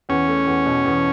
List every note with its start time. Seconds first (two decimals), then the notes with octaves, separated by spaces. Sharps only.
0.09 E2 C#4
0.28 A3
0.47 E2
0.65 B2
0.85 E2